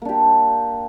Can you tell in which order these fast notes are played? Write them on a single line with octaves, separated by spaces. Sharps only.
A#3 D4 G4